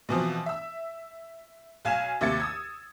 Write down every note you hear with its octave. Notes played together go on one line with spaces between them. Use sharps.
B2 E3 F3 C4
E5 E6
B1 F5 G#5 F6 G#6 E7
D#2 C3 E5 G#6 A6 C#7
D#6 E6 G#6